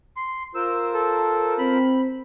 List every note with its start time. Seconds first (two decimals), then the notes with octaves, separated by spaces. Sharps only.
0.17 C6
0.55 F4 A#4 C5 E6
0.94 A4
1.59 C4 B5